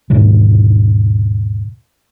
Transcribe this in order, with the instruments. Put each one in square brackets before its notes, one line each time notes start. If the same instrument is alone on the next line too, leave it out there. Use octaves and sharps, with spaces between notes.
[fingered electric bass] D#2 G#2 B2 D3